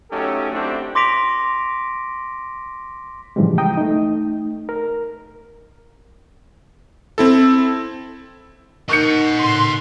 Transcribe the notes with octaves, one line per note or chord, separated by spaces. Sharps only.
F#3 A3 C#4 D#4 G4 A4
A3 C4 D4 E4 F#4 G4
C6 D6 A#6 B6 D7 F7
A2 C#3 E3 F3 G3 G#3
G5 A#5 D#6
A3 D#4
A#4
C4 E4 A4
D#4 A#4 D#5 F#5 C#6 G6 C#7
A2 C#3 C6